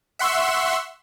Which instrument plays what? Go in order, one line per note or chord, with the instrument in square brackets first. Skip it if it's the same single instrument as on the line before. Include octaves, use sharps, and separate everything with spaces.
[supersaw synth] E5 F#5 C6 C#6 E6